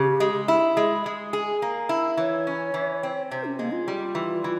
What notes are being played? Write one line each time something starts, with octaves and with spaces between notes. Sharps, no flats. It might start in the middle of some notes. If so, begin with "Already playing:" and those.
Already playing: C#3 G4
G#3
E4
G#3
G#3
G#4
A#3
E4
E3 C#5
C#4
E3
C4
C3 C5
C#4
G#3 A#3
F4
G3
E3
E3